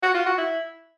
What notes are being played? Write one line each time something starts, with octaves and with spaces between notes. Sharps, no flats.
F#4
F4
F#4
E4